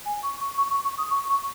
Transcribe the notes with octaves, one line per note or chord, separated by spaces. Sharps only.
G#5
C#6
C#6
C#6
C#6
C#6
D#6
C#6
C#6